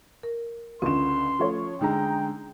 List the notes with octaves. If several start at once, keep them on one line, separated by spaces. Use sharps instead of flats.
A#4
C#2 D3 C#4 C6 E7
F3 A3 C#5
D3 G#3 D#4 G5 A#5